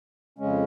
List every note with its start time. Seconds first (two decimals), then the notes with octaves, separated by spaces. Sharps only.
0.38 F2 C#3 G#3 C#4